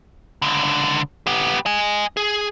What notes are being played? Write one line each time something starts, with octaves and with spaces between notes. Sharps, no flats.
C#2 D3
B3 G4
D#5 G#5
G#4